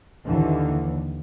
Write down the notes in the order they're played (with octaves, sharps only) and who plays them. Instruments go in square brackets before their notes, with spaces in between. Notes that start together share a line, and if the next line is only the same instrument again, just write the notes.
[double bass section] D#2 D3 E3